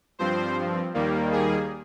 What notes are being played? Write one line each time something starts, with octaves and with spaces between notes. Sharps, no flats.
G2 F3 C4 C5
D#2 D#3 G3 A#3
G#4